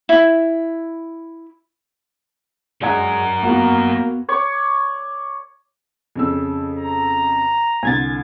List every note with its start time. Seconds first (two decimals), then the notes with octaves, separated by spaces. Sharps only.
0.09 E4
2.82 F#3 G#3 A#4 D5 F#5 G#6
3.42 A#3 B3 F#4
4.28 C#5 D5 C#6
6.16 F2 C#3 E6
6.78 A#5
7.83 C2 D3 G#5 G#6 A6